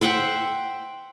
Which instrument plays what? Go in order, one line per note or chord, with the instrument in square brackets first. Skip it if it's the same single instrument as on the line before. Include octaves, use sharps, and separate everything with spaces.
[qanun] C5 E5 F#5 G5